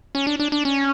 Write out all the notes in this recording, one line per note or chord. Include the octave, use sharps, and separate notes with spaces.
C#4
D4
D4
D4
C#4